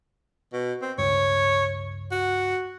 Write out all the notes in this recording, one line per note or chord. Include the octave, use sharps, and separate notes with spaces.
B2
C4
C#2 G2 C#5
F#4